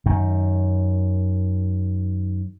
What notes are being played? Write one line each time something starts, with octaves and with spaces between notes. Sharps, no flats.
F#2 D#3